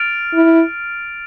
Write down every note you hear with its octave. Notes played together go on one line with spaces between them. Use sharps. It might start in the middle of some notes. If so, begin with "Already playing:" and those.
Already playing: F6 A6 D7 F7
E4